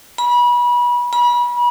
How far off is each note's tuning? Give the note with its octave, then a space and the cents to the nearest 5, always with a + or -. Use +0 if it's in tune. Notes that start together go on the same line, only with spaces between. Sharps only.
B5 -30
B5 -35